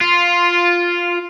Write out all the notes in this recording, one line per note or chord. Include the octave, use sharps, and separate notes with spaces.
F4